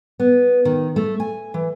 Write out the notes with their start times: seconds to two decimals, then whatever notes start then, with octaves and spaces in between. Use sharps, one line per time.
0.20 B3
0.65 D#3
0.96 A3
1.20 G#5
1.54 E3